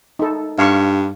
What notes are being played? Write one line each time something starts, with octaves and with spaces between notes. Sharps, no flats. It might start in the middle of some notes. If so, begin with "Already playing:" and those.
D#4 A4
G2 F5 C#6